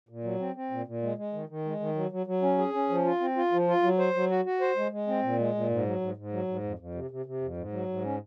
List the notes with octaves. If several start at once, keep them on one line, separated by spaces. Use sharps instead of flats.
A#2
F#3
C4
C4
A#2
A#2
G#3
G#3
D#3
D#3
G#3
D#3
F#3
F#3
F#3
C#4
G#4
C#4
F3
F4
C4
F4
F3
F4
F#3
C5
F#3
F#4
F#4
C5
G#3
G#3
C4
A#2
G#3
A#2
G#2
F#3
G#2
G#2
F#3
G#2
F2
F2
C3
C3
C3
F2
G#2
F#3
G#2
C#4